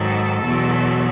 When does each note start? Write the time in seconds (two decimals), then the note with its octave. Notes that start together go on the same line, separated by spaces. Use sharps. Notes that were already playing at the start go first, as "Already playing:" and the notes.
Already playing: G#2 D#3 F#3 A4
0.44 E2 B2 F#3